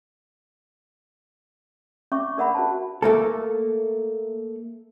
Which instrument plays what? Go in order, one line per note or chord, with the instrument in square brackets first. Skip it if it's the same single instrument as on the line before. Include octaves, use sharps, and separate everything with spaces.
[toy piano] C#4 E5 C#6 D6
D4 A#4 E5 F#5 B5 C6
F#4 C5 A5
[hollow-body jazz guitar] A3 A#3 A4